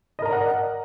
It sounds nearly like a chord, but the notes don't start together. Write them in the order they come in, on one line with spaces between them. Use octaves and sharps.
D#5 A#4 A#5 D5 F#5